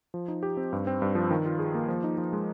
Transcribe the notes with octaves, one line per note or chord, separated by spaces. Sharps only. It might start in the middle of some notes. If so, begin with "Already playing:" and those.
F3
D#4
G4
C4
G2
C4
G2
F3
D#3
F4
G#4
A#3
F3
D#4
F3
G#3